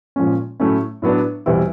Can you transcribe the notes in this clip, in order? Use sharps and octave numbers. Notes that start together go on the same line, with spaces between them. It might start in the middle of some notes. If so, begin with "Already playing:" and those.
A#2 F3 G#3 C#4
A2 F#3 A3 C#4 E4
A2 F#3 B3 D4
E2 B2 G3 C4 E4